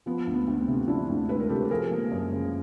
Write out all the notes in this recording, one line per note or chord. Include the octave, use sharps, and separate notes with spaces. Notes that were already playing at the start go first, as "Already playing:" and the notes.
F3 B3
D2
B3
D2
C4
C3
F3 D4 E4
D2
D2 B4
A#4
C3 G4 A4
F3 G#4 A#4
A#3
F#2
C#3